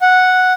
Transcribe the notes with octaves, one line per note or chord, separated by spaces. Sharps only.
F#5